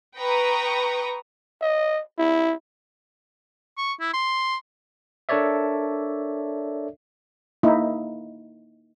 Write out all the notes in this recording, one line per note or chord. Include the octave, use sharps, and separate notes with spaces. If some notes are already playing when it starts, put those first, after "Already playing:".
B4 G5 A#5 C#6 D#6
D#5
E4
C#6
E4
C6
D4 A4 A#4 C#5 D5 E5
A#3 D#4 E4